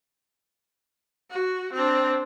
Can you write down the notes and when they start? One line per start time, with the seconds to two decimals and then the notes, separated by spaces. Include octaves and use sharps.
1.30 F#4
1.73 C4 D4